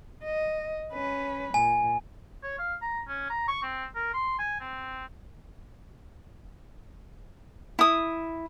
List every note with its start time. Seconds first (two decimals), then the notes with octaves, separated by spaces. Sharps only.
0.24 D#5
0.93 C#4 B4
1.54 A#2 G#5
2.43 C#5
2.59 F5
2.82 A#5
3.08 C#4
3.30 A#5
3.48 C#6
3.63 C4
3.95 A#4
4.14 C6
4.39 G#5
4.60 C4
7.79 E4 D#6